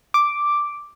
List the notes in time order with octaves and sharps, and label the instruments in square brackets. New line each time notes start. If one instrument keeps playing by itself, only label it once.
[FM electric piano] D6